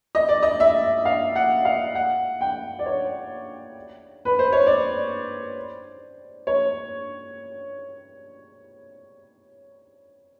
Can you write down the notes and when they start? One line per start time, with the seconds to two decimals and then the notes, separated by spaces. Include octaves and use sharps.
0.15 D#5
0.29 D5
0.43 D#5
0.60 E5
1.05 F5
1.35 F#5
1.65 F5
1.95 F#5
2.41 G5
2.79 D5
2.86 C#5
4.25 B4
4.39 C5
4.52 C#5
4.67 D5
6.47 C#5